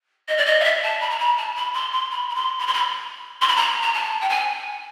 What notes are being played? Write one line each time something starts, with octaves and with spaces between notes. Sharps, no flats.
D#5
D5
D#5
F5
E5
A5
B5
A#5
B5
A5
B5
C6
C6
B5
B5
C6
B5
C6
B5
C6
B5
A#5
A#5
A5
G5
G#5